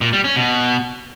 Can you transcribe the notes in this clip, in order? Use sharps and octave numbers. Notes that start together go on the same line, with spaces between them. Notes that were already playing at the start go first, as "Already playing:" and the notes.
A#2
G3
C#4
B2